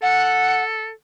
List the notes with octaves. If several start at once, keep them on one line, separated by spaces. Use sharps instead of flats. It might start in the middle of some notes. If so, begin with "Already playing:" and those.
A4 F#5